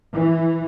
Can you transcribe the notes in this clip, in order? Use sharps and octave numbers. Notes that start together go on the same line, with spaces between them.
E3